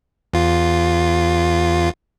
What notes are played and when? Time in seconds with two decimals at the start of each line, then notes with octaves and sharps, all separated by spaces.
0.33 E2 F4